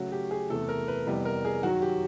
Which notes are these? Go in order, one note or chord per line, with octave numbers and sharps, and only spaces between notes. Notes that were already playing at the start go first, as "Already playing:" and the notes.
Already playing: C#3 F#3 A3 C#4 F#4
G4
G#4
E2 C3 E3 A3 A4
A#4
B4
F2 C3 E3 G3 B3
A#4
G#4
F#2 D#3 F#3 F#4
G4